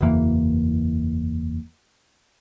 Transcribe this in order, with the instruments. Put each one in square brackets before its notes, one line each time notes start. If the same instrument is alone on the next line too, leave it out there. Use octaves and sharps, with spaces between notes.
[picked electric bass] F#1 E2 E3 A#3